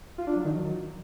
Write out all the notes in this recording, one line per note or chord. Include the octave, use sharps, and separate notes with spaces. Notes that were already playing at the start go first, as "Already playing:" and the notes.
F4
D4
F#3
D#3
F#3